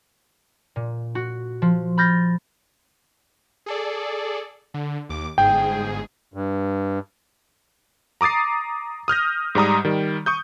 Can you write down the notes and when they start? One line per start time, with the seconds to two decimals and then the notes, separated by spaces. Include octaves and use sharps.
0.76 A#2
1.15 F#4
1.62 F3
1.98 B5 F6 G6 A6 A#6
3.66 G#4 A4 D5
4.74 D3
5.09 D#2 D6
5.38 G1 G#2 G#4 G5
6.34 G2
8.21 A#5 D6 D#6 A6 C7
9.08 D#6 F6 G6 A#6
9.55 G#2 G3 A#5 D#6
9.85 D#3 G3
10.26 C#6 D#6 G6